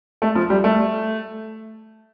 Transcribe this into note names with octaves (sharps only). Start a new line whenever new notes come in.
A3
F3
G3
A3